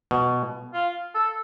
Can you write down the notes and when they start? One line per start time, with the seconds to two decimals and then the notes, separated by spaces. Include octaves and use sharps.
0.11 B2
0.73 F4
1.15 A4